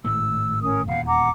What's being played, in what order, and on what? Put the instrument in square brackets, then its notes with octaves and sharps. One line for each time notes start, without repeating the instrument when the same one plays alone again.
[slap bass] G#1 A2 A3 [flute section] E6
[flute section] C#4 A#4 D#6
[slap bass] D#1 E2 [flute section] F5 F#5
[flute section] F#5 A#5 D6